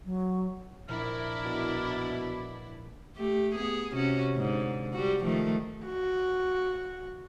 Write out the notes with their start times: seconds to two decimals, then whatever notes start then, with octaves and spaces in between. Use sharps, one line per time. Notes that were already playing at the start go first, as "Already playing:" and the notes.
0.06 F#3
0.88 A#1 D4 E4 A#4
1.45 B2
3.16 A3 G4
3.55 B3 G#4
3.93 C3 C#4 F#4
4.34 G#2 D3
4.93 G3 F#4
5.24 D#3 F3 A3
5.86 F#4